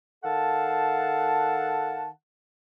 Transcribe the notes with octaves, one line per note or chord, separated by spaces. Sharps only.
D#3 A4 F5 F#5 A5